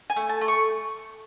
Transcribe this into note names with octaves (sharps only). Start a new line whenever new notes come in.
G#5
A3
A5
A3
C#6